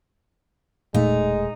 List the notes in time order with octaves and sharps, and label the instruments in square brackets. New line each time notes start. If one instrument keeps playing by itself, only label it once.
[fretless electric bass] E1 A3 [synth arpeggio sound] A#2 [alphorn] G#3 [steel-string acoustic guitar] D#4